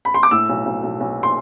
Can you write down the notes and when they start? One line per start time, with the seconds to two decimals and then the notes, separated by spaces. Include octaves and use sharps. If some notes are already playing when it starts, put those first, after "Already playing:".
0.05 B5
0.14 C6
0.23 D6
0.31 A2 E6
0.49 B1
0.66 B1
0.83 B1
1.00 B1
1.23 C6